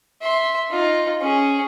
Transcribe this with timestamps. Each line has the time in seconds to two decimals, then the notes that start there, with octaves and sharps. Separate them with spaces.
0.21 E5 C6
0.71 D#4 F4
1.21 C#4 G#4